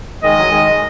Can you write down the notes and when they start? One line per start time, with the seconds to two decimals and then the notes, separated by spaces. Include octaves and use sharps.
0.23 D#3 G#3 D#5
0.38 F#3
0.50 D#3 G#3